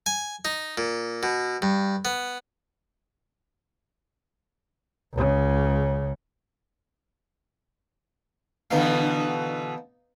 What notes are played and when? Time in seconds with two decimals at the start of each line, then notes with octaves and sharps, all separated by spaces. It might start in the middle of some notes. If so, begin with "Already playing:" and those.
0.06 G#5
0.45 D#4
0.78 A#2
1.23 B2
1.62 G2
2.05 B3
5.14 C#2 C#3
8.71 B2 D3 E3 B3 D#4 F5